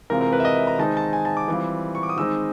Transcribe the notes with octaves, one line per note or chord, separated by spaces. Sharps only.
C3 E3 G#3 C4 F4 A#4
A#4
B4
E5
D#5
E5
A#5
D#3 G#3 C4 D#4 A5
A5
G#5
A5
D6
E3 G3 C4 F4
C#6
D6
D#6
D#3 G#3 C4 D#4 E6